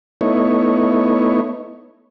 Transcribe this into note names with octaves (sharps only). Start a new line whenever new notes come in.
A3 B3 D#4 E4 C#5